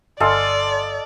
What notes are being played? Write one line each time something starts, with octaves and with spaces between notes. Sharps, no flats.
G1 A4 D5 D#5 F5 G#5 C6